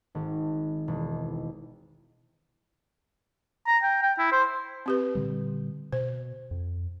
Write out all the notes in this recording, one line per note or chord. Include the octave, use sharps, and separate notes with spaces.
G#1
E1
A#5
G5
G5
E4
C5
C4 G4 B4
A#2 D3 G3
B2 C5
F2